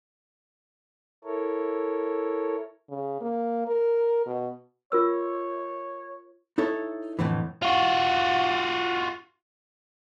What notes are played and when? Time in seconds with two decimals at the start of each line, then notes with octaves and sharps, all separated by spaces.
1.24 E4 A4 A#4 C#5
2.90 C#3
3.21 A#3
3.68 A#4
4.27 B2
4.92 F4 A#4 C#5 E6
6.58 D#4 E4 A4 C#5
7.19 F2 A2 D3 E3
7.62 F4 F#4